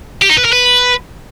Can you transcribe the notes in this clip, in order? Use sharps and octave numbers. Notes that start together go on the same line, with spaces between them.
G4
D#4
B4
A#4
B4